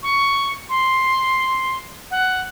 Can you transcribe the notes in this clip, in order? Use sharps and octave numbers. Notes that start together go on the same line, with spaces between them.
C#6
C6
F#5